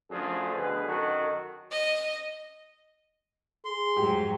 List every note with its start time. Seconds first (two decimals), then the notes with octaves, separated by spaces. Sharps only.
0.11 F#2 D3 F3 A3 D4 G#4
0.56 D2 B2 D3 G#4 B4
0.88 F#2 D#3 D#4 F#4 A4
1.72 D#5
3.65 G#4 C6
3.97 F2 G#2 F#3 G4